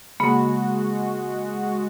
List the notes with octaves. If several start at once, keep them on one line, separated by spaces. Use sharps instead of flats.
C#3 G#3 A#3 F#4 B5